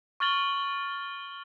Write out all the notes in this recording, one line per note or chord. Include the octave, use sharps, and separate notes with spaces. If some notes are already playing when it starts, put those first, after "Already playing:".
C#6 F6 A6 F#7 G7